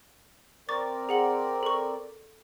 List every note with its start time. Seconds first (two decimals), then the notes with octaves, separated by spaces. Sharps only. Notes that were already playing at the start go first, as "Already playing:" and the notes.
0.69 C4 A#4 D5 C#6 D6 A6
1.09 G#4 F#5 F#7
1.63 A4 C#6